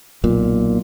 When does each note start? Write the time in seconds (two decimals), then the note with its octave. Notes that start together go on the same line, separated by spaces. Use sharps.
0.24 B1 A#2